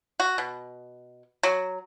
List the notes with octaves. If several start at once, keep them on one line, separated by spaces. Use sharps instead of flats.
F#4
B2
F#3